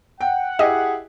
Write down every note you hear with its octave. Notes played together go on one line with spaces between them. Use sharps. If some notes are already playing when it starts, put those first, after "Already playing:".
F#5 G5
E4 G4 G#4 D#5